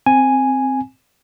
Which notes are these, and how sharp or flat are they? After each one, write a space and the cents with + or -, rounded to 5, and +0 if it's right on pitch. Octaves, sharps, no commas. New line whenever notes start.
C4 +0 G#5 +0